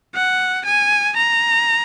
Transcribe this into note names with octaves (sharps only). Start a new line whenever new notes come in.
F#5
G#5
A#5